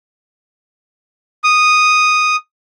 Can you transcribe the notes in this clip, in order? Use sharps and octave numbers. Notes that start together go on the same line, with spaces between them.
D#6